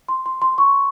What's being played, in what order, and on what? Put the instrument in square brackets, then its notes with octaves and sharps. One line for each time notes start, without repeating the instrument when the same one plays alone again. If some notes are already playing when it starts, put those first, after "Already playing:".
[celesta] C6
C6
C6
C#6